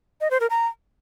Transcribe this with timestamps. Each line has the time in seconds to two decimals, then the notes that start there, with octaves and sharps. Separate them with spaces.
0.21 D#5
0.31 C5
0.40 A#4
0.50 A#5